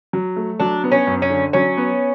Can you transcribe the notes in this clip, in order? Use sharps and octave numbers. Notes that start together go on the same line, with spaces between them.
F#3
A3
F#3 D4
B3
C#4
F#2
C#4
D3
F#3 C#4
B3